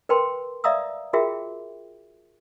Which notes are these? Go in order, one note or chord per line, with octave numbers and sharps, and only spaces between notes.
A#4 B4 G5 A5 C6
D5 E5 F5 A#5 D#6 E6
F4 F#4 G#4 A#4 E5 G5